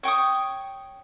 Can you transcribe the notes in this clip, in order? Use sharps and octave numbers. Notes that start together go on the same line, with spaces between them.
C#5 G5 C#6 D#6